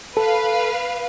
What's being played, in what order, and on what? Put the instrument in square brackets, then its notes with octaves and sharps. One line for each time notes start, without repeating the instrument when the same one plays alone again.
[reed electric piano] A4 [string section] B4 F5